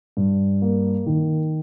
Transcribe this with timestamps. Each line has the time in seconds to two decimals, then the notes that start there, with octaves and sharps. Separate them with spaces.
0.17 G2
0.62 A#3
1.06 D#3